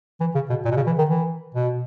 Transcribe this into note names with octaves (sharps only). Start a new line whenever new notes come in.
E3
C#3
B2
A#2
B2
C#3
E3
D#3
E3
B2